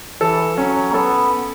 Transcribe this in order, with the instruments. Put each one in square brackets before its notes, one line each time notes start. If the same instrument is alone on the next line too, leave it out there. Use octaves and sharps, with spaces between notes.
[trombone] E3 [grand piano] A4
[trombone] F#3 [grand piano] C#4
[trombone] B3 [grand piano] A4